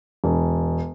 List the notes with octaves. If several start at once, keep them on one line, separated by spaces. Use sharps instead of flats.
E1